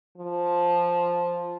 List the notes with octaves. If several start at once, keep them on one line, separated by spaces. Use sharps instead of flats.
F3